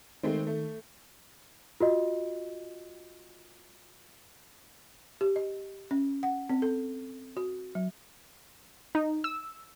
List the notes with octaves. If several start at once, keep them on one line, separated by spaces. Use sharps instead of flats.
D#3 G#3 A3 C4
A3
F4 F#4 D#5
G4
D#5
C#4
F#5
C4
A4
F#4
F#3
D#4
E6